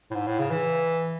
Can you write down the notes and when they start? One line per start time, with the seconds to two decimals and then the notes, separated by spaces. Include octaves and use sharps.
0.11 A2
0.15 G#2
0.26 A2
0.39 C#3
0.50 E3